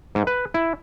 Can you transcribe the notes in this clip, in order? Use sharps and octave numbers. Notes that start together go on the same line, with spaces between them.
G#2
B4
E4